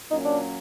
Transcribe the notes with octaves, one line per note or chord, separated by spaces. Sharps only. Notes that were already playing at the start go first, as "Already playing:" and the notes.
A#2 F#3 A#3 C#4 D#4
D4